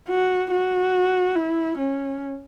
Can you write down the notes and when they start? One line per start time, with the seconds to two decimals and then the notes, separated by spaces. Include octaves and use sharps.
0.09 F#4
0.51 F#4
1.36 E4
1.78 C#4